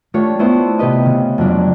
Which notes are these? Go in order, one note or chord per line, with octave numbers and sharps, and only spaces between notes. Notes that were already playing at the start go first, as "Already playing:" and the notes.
A3 D4 F4 G4 C#5
A3 B3 E4 C5
C3 G4 B4 D#5
C#3
F2 F#3 G3 D4